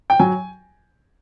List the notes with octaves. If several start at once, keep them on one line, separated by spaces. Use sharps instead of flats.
G5
F#3 G#5